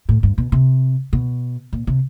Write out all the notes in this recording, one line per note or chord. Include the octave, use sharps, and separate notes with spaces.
A2
G2
B2
C3
B2
A#2
C3